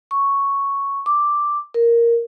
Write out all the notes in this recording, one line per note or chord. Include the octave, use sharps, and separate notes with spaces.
C#6
D6
A#4